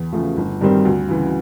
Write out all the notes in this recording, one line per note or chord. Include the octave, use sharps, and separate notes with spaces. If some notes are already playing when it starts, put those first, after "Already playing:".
Already playing: E2
C#3 F3 A3
G1
G2 D#3 G3 C4
D2
C#3 E3